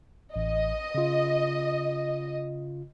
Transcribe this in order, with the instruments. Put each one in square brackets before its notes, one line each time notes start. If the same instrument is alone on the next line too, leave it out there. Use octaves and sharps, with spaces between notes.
[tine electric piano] A1 [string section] D#5
[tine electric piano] C#3 F4